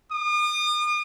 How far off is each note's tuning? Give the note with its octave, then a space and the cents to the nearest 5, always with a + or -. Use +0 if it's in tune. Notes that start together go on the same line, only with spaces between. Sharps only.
D#6 -40